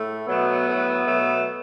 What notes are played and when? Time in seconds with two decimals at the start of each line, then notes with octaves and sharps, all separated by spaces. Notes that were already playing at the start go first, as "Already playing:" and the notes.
Already playing: A2 A3
0.27 B2 F#3 A3 B3
0.67 A2 F#3 A3
1.05 B2 F#3 A3